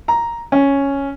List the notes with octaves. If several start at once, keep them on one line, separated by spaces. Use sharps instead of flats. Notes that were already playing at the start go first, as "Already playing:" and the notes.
A#5
C#4